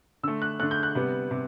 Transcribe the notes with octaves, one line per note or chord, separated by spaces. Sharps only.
D3 A3 E6
F#6
D3 A3 F#6
G6
F#6
C3 G3 B3
C3